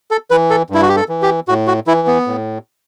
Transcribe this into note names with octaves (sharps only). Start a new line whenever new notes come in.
A4
E3 B4
A4
G2 E4
F#4
G4
A4
E3
G4
A2 F#4
F#4
E3 E4
B3
A2